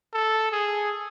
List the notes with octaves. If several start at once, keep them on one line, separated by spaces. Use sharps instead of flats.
A4
G#4